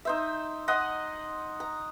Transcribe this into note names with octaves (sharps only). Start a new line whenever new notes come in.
D#4 C5 E5
D#5 F#5 C6 D#6
A#5